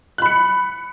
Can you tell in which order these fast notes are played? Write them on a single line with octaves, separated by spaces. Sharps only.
F#6 B5 C#7